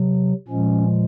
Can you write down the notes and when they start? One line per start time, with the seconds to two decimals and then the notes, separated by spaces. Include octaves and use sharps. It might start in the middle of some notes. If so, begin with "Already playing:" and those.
Already playing: C3 F#3
0.48 A#2 F3 G#3 C#4